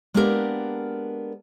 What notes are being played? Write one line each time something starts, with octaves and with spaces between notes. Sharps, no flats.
G#3 A#3 B3 D4 G4 A#4